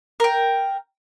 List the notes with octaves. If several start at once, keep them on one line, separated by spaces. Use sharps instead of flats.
A#4 G5